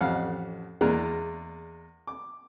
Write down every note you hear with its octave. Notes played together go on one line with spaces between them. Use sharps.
A1 F2 F5 F#5
E2 G#3 A#3 D4 A#4 F#6
D6